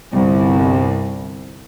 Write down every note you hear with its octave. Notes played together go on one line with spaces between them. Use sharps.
G1 C2